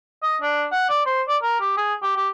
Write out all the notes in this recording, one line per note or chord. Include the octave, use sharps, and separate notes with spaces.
D#5
D4
F#5
D5
C5
D5
A#4
G4
G#4
G4
G4